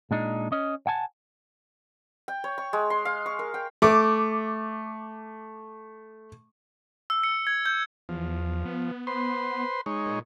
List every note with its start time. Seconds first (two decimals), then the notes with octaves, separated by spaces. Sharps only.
0.11 A#2 G#3 D4 D#4
0.52 C#4 D#5
0.87 F#5 G#5 A5
2.28 G5
2.44 C#5
2.58 C#6
2.73 G#3
2.90 C6
3.05 F5
3.26 C#6
3.39 A#4
3.54 G5
3.82 A3 D6
7.10 E6
7.24 C#7
7.47 G#6
7.66 G6
8.09 E2 F3
8.65 B3
9.07 B4 C5 C6
9.86 G#3 D#4 C#5
10.06 A#2